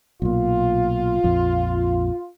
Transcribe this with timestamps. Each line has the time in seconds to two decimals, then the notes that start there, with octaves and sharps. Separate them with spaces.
0.22 B1 A#2 F4
1.24 A#1 F2 F3